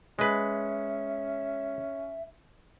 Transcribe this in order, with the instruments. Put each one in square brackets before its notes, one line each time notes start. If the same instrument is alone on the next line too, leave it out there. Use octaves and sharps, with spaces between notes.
[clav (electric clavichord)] G#3 B4 [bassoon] C#4 [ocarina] E5